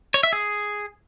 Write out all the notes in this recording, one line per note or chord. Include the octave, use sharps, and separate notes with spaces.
C#5
E5
G#4